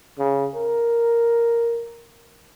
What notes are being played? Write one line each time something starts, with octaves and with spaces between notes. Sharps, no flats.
C#3
A#4